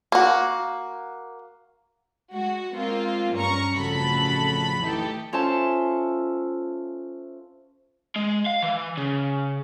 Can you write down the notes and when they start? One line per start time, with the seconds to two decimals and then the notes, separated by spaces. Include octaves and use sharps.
0.12 A#3 F#4
2.32 G#3 F#4
2.74 G#3 A#3 C4 F4
3.34 G2 C#4 A#5 C#6
3.74 A1 F2 C#3 F#4 A4 B5
4.81 E3 A3 D#4 G4 A4
5.33 C#4 F4 A4 C5 E5 A5
8.16 G#3
8.46 F5
8.62 E3
8.97 C#3